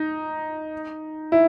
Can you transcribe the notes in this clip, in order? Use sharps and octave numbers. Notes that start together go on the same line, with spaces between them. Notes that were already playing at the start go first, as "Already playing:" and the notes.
Already playing: D#4
E4